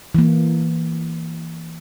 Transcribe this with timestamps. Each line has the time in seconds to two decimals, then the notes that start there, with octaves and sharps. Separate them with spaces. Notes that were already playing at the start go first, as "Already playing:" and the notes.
0.15 E3 A#3